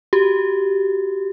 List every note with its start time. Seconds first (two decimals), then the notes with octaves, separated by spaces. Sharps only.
0.13 F#4 G4